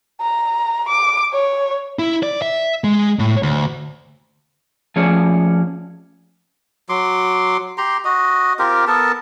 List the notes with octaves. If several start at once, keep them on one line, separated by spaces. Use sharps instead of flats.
A#5
D6
C#5
E4
D5
E5
G#3
A2
D2
F3 A3 C#4 G#4 C#5 D5
F#3 C6 D6
G4 A#5 C6
F#4 D#5
C4 F4 G4 A#4
B3 A4 A#4 A5